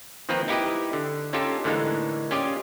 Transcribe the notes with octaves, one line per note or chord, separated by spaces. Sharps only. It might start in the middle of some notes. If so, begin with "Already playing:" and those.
D#3 F3 A#3 C4 B4 A#5
D#4 E4 G4 B4 D#5
D3
C#4 D#4 F4 G4 A4
A2 D3 E3 G#3 A#3 D#4
C#4 F4 G4 D5 D#5